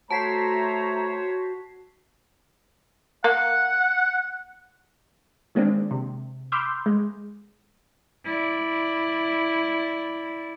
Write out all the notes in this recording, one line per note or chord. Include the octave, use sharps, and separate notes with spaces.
A3 F#4 C5 C#5 A5 A#5 B6 C7
A#3 F#5
D#3 G#3 A#3 C4 D4
C3
B5 C6 D6 E6 F6 G6
G#3
E4 D5